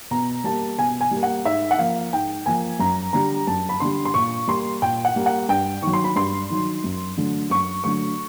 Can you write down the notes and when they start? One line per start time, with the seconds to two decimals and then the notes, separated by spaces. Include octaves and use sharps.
0.11 B2 A#5
0.44 G3 A#3 A5
0.79 B2 G#5
1.01 G#5
1.11 G3
1.17 A#3
1.23 F#5
1.45 G#2 E5
1.71 F#5
1.79 F3 A#3 F5
2.12 G#2 G5
2.46 F3 A#3 G#5
2.79 F#2 A#5
3.13 D3 G3 A#5
3.47 F#2 A5
3.69 B5
3.80 D3 G3 C6
4.05 C6
4.14 A#2 C#6
4.48 G3 A#3 C6
4.82 A#2 G5
5.05 F#5
5.16 G3 A#3
5.26 F#5
5.49 G2 G5
5.82 D#3 F#3 C#6
5.93 C6
6.04 B5
6.16 G2 C6
6.50 D#3 F#3
6.84 F#2
7.17 D3 F#3 A3
7.50 F#2 C#6
7.84 D3 F#3 A3 C#6